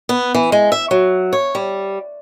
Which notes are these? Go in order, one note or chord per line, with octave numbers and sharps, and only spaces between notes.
B3
E3
G#3
E5
F#3
C#5
G3